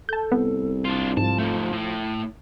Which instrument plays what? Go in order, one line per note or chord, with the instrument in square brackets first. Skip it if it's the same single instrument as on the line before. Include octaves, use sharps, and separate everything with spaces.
[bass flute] A4 [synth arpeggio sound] A5 G6
[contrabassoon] C2 [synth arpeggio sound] B3
[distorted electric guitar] D4 F4
[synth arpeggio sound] G#2 [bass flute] F3 [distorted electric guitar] A5
[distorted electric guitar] A3 D#4
A2